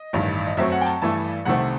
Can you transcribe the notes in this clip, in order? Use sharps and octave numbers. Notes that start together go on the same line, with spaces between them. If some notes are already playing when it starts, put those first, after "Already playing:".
Already playing: D#5
A1 G2 D#3
D#5
F#2 F#3 A3 C4 E5
F#5
G5
A5
G2 E3 A3 A5
C2 C3 D#3 A3 C4 F#5